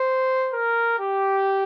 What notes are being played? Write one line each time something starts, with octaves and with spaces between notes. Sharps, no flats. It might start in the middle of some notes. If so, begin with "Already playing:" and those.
Already playing: C5
A#4
G4